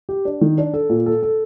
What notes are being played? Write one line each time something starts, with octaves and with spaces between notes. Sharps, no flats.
G4
D4
D#3
D4
A4
A#2
A4
A4